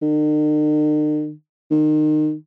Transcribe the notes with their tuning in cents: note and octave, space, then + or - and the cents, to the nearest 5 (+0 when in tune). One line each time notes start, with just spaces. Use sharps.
D#3 -45
D#3 -25